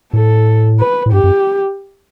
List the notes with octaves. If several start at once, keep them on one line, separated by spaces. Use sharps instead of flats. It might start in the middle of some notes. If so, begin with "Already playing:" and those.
A2 A4
B4
A2
G2 G4
F#2